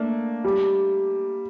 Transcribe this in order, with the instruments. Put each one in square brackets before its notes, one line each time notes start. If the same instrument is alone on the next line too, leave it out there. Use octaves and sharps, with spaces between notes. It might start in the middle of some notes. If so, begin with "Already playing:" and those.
Already playing: [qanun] A3 D4 [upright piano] A#3
[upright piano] G3